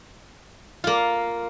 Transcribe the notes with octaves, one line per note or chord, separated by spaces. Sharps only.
A#3 F4